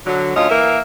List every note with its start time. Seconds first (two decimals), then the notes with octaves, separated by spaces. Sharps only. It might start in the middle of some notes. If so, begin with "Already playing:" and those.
0.06 D3 F#3
0.36 D2 C#4 F4 D#5
0.50 E3 A#3 A#4 E5